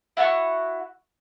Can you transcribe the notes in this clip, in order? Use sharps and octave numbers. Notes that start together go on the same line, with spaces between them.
E4 F#4 G#5 C#6